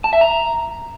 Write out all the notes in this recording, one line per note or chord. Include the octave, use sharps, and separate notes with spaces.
A5
E5
A#5